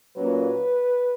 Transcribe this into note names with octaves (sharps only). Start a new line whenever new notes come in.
A#2 F#3 A#3 C#4 B4